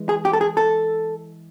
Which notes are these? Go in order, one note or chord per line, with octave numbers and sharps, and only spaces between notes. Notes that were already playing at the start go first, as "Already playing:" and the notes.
Already playing: E3 G#3
G#4
G4
A4
G#4
A4